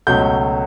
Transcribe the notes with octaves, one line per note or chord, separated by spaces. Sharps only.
C#2 B2 F#3 A3 G6